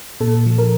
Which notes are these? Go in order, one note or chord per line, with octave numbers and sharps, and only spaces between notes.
A#2 A4
F3
A#4